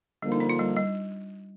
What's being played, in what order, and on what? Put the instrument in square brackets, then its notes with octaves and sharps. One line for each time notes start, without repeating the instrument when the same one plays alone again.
[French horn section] D3 F3 A#3 [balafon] G3
[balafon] D#4
D4
F4
G3
G3